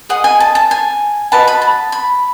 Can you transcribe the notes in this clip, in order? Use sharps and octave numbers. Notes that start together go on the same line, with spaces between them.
G#4 D#5 F#5
G#5
A5
A5
G#5
F#4 B4 D#5 A5
B5
A5
B5